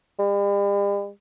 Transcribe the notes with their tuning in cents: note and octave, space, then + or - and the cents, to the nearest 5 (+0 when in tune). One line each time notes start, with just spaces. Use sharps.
G3 +45